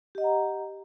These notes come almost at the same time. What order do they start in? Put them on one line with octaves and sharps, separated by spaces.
G4 D#5 F#5 A#5